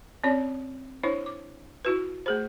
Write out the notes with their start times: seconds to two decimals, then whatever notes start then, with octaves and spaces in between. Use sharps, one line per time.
0.24 C4 C#4 C#5 D5
1.03 D4 E4 C5 C#5
1.26 D6
1.85 E4 F#4 B4
2.26 A3 G#4 C5